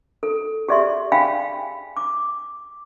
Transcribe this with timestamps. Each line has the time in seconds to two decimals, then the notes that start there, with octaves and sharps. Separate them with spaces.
0.23 A4
0.69 G4 G#4 D5 E5 C6
1.12 F5 G5 G#5 B5
1.97 D6